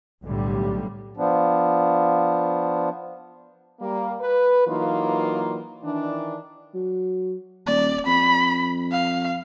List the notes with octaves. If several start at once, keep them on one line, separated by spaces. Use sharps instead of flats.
B1 A2 D3 G3
F3 B3 D4
G3 A#3
B4
E3 F#3 A#3 D#4 F4
D#3 E3 D4
F#3
D#1 D5
F2 B5
F5